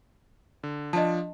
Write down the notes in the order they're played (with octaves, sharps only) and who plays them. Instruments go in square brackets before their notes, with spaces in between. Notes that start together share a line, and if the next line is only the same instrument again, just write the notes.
[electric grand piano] D3
[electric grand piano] F3 D4 [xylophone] D#5 A5